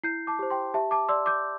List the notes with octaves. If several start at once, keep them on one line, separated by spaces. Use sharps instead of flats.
E4 G6 C7
A5 D6
G4 C5
G5 C6
G4 E5 A5
A5 D6
D5 C6 E6
D6 G6